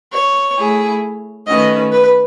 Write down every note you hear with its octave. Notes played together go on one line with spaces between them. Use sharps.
C#5
A3 E4 G#4
D#3 A3 C#4 F#4 B4 D#5
B4